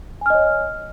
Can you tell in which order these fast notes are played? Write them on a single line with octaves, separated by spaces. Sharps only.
G#5 F6 D#5 C#5